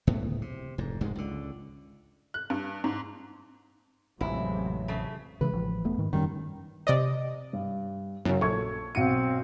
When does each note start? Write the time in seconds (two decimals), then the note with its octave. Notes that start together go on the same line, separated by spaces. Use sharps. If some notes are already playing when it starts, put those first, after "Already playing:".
0.07 D1 C#2 A2 B3
0.42 C3
0.78 F1 G#2
1.01 F1 D2 G#2 G#3
1.15 C#2 D3
2.34 F#6
2.50 G2
2.84 G#2
4.21 A1 F2 A2 C3 F#3 G#3 E4
4.88 C#3 A3
5.41 C#3 E3 G#3 B4
5.53 A1 F3
5.85 E1 A3 B3
5.98 G#2 D#3
6.13 F#2 D#3 G3 C#4
6.87 C3 D5 D#5
7.53 G2
8.25 F#2 C#3 F#3
8.41 A#1 A4 C#6 G#6
8.95 B1 C4 F#4 C#7 D#7